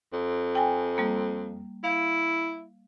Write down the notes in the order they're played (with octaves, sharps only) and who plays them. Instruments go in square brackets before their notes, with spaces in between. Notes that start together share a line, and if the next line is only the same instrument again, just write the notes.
[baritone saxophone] F2
[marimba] G5 G#5
G3 A#3
[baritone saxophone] E4 [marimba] F5